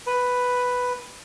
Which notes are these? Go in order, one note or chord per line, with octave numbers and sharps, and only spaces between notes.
B4